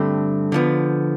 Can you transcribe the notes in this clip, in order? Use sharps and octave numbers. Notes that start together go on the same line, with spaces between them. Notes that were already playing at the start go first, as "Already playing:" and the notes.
Already playing: G2 D3 A3 C4
D3 F3 B3